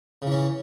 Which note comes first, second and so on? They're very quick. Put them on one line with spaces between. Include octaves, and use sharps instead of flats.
C#3 E3 C#4